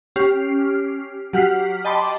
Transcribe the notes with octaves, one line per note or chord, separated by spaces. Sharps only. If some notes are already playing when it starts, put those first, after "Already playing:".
C#4 G4 F6 C7
F#3 G4 F#5 F6 B6 C7
D#5 G5 A5 B5 C6 D6